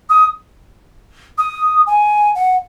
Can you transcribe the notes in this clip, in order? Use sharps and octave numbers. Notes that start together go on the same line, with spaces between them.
D#6
D#6
G#5
F#5